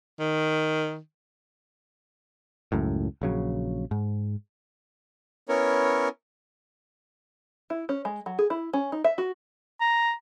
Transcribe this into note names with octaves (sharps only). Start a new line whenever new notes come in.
D#3
C#2 F#2 A2
A#1 C#3 F#3
G#2
B3 C#4 E4 A#4 C#5
E4
C#4
G#3
F#3
G#4
E4
C#4
D#4
E5
F#4
A#5